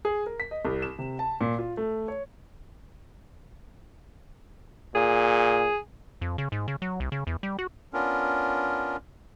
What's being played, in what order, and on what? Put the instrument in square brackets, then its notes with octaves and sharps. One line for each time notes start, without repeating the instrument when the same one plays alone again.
[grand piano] G#4
A#4
B6
D#5
C2
E7
C3
A5
A#2
F4
A3
C#5
[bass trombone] A#2 [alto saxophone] G#4
[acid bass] F2
C#3
G#2
C#3
F#3
C2
C#3
E2
G3
F#4
[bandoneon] B3 C#4 D4 F4 A#4